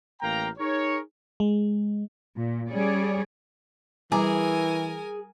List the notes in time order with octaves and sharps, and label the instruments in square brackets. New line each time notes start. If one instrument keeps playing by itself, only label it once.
[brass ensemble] A1 A#3 F5 G5 A#5
D#4 G#4 A#4 C#5
[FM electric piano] G#3
[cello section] A#2
G3 C#4 G#4 C#5 D5
[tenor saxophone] E3 [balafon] G3 A#5 D6 [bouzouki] G#4 [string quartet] A#4 G#5